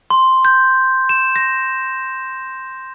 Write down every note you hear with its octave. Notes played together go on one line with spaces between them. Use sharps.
C6
G6
E7
A#6